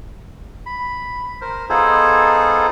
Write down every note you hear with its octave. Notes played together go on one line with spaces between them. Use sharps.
B5
A#4 C5
B3 D#4 F4 G#4 A4 C5